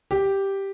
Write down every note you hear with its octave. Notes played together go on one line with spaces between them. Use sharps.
G4